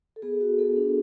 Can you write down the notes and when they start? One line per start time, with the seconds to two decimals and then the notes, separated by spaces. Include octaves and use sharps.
0.16 A4
0.22 B3 G#4
0.41 F#4
0.58 B3 A4
0.76 D4